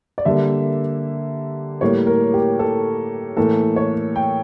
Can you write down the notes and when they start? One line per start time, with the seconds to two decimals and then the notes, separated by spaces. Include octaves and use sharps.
0.18 D5
0.25 D3 G3 A#3 E5
1.81 A2 G3 A#3 C#5
2.07 A#4
2.34 G4
2.59 A4
3.37 A2 E3 A#3 A4
3.76 C#5
4.16 G5